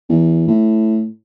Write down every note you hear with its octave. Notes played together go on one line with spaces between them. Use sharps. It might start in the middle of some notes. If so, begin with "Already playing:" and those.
E2
A2